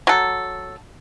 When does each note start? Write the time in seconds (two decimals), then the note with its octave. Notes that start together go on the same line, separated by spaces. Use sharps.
0.07 F#3 A4